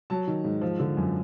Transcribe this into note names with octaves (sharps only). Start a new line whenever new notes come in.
F#3 A5
D#3
G#2
F3
D3
F#2